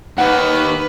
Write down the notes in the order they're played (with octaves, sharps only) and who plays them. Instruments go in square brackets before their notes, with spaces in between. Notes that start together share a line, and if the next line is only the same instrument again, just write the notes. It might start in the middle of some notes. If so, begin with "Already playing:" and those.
[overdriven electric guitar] D#2 D#3 [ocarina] D#4 [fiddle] B4 [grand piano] F#5